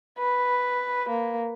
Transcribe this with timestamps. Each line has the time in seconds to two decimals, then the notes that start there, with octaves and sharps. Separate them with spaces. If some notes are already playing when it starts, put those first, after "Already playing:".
0.19 B4
1.08 A#3